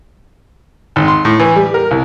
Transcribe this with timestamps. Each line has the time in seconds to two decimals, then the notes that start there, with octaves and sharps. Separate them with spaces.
0.96 G#1
1.08 C6
1.25 A2
1.40 E3
1.56 G3
1.74 A#4
1.91 C2